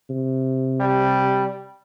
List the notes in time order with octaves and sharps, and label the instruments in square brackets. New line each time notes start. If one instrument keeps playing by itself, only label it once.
[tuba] C3
[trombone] G3